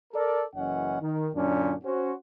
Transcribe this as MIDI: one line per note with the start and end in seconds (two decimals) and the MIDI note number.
0.13 0.43 69
0.13 0.43 70
0.13 0.43 74
0.55 1.00 30
0.55 1.00 42
0.55 1.00 52
0.55 1.00 61
0.55 1.00 75
0.55 1.00 78
1.01 1.28 51
1.35 1.74 42
1.35 1.74 46
1.35 1.74 50
1.35 1.74 61
1.35 1.74 62
1.83 2.13 61
1.83 2.13 66
1.83 2.13 72